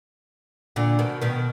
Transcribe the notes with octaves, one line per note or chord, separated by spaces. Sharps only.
A#2 D3
B2 D#3
B2 D#3